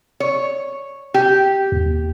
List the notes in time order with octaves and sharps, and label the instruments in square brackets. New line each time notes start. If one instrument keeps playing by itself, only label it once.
[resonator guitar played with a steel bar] C#5
G4
[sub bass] D#2